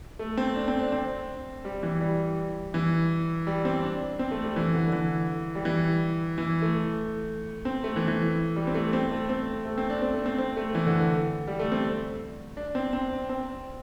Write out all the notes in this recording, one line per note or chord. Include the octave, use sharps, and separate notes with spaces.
A3
C4
D4
C4
D4
C4
G3
E3
G3
E3
G3
C4
D4
C4
A3
G3
E3
D3
E3
G3
E3
E3
A3
C4
A3
E3
E3
G3
C4
A3
C4
A3
C4
A3
C4
D4
C4
A3
C4
C4
A3
E3
D3
G3
A3
C4
D4
C4
C4
C4